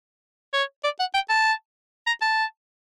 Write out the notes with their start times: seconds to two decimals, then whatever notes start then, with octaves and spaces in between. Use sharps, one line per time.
0.53 C#5
0.84 D5
0.99 F#5
1.14 G5
1.29 A5
2.07 A#5
2.21 A5